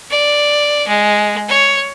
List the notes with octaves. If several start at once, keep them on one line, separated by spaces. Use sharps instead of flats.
D5
G#3
C#5